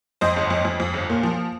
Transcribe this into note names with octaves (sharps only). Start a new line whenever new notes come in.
F2 C5 D#5
G1
F2
F2
F2
G1
A#2
F3